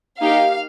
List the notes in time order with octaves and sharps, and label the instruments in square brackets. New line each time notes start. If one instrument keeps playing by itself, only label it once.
[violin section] A#3 D#4 G4 F5